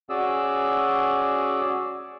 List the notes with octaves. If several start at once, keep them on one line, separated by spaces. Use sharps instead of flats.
C#4 F#4 G#4 D5 E6